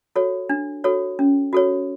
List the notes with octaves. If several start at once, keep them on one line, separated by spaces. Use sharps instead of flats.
F#4 A4 C#5
D4
F#4 A4 C#5
C#4
F#4 A4 C#5